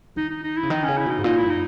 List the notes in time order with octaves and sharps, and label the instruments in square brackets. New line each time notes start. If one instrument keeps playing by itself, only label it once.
[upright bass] D#3 [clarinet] D#4
[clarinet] D#4
D#4
E4
[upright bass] C#3
[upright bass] D#3 [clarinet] D#4
[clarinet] C#4
[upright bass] C#3
[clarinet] E4
[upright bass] B2 [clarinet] D#4
[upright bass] G#2
[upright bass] A#2 [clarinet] D#4
[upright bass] F#2 [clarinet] E4
[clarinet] D#4